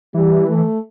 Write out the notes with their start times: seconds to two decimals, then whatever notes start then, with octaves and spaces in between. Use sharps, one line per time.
0.14 E3 G3
0.48 A3